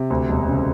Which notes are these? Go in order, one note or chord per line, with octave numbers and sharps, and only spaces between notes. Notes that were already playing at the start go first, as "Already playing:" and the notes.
Already playing: C3
D2
E1
C#3